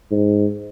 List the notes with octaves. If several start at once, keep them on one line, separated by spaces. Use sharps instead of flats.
G#2